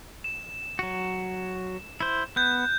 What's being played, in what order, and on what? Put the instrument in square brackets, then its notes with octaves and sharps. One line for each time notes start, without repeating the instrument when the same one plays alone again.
[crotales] E7
[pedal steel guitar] F#3 F#4
E4 C5
[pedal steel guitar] B3 [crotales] F#6 G6